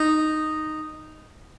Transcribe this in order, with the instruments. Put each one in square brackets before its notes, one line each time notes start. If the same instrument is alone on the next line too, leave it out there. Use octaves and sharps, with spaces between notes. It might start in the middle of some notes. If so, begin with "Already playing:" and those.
Already playing: [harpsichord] D#4